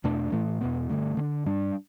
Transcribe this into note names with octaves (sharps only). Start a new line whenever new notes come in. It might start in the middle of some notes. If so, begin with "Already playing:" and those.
E2 B2 A3 D4
A2 E3 A3
E2 B2 B3
G2 D3 A3
D3 B3 D4
G2 G3 D4